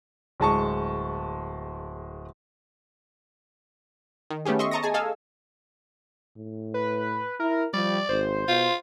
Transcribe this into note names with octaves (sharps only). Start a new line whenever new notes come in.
D1 G#3 A5 C#6
D#3
A3 B3 C#4 G4 G#4
D#5 E5 C6 C#6
D#5 A5 A#5 C#6 D#6 A#6
G#4 G#5 A5
G#4 A4 D#5 F5 G#5 E6
A2
B4
E4 A#4
F3 G3 D5
G#1 C5
B2 F4